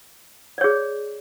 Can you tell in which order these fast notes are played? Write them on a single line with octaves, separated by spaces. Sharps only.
D5 C#5 G#4